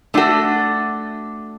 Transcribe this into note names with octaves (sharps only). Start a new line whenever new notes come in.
A3 D4 F#4 A4